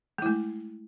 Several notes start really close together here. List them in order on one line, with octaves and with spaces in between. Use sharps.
G#3 E4 A3